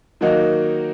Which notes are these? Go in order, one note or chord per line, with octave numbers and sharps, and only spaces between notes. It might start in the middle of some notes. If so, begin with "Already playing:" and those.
D#3 F#3 A#3 D#4 F#4